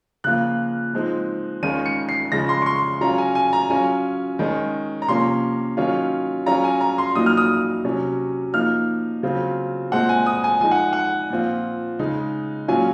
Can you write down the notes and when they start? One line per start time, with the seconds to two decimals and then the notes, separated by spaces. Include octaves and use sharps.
0.24 C#3 F3 A#3 F4 F#6
0.93 F3 G#3 C4 D#4
1.63 D#3 G#3 C#4 F4 D#7
1.86 C#7
2.09 C7
2.32 C#3 F3 G#3 C#4 A#6
2.49 C6
2.62 C#6
2.66 C6
3.01 F#3 C#4 F4 A#5
3.18 G#5
3.35 G#5
3.53 A#5
3.70 F#3 C#4 F4 G#5
4.39 D#3 G#3 C#4
5.02 A#5
5.08 C3 F3 A#3 C#4 C6
5.77 D#3 F#3 C#4 F4
6.46 F#3 C#4 F4 A#5
6.64 G#5
6.81 A#5
6.98 C6
7.15 A#2 F#3 A#3 D#4 D#6
7.26 F6
7.37 D#6
7.85 C3 F#3 C#4
8.54 F3 A#3 D#4 F6
9.23 C#3 F#3 C4 F4
9.92 A#2 G#3 C4 F#5
10.09 G#5
10.26 D#6
10.44 G#5
10.61 F3 G#3 D#4 G#5
10.71 F#5
10.93 F#5
11.30 A#2 F3 C4 F4
11.99 C#3 G#3 D#4
12.68 A#2 F#3 C#4 F4 G#5